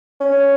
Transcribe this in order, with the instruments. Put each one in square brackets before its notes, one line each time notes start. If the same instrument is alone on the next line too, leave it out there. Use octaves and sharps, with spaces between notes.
[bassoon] C#4